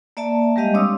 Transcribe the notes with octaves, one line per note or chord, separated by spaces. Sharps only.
A#3 D5 E5 A5
G3 G#3 G4 D#5 F5
C4 D4 C#5 D#6 E6